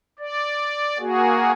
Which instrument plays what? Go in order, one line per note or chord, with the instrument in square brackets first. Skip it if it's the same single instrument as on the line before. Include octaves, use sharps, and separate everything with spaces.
[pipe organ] D5
A#3 F#4 G#4